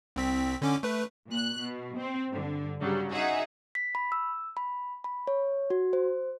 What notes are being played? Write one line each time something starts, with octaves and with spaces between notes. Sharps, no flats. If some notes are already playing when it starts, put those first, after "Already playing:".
C2 C4 B6
D3 C#4 D6
A3 B4
A#2 F#6
B2
C4
G2 D3
G2 C#3 F#3 G3
D#4 F#4 G#4 E5 F#5
B6
B5
E6
B5
B5
C#5
F#4
C5